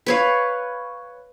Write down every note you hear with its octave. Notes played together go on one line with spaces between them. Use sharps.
B4 C#5 F5